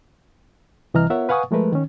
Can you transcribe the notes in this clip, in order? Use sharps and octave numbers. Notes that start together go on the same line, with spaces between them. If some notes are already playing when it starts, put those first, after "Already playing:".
C2 E3 D#5 A#5 F6
B3 F4 A#4 C#5 E5 F#5
B4 F5 F#5 G#5 C#6 D#6
F3 G#3 A3 A#4 B4
D#3 C#4